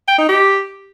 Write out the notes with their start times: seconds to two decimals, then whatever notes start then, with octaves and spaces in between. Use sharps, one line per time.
0.08 G5
0.18 D#4
0.29 G4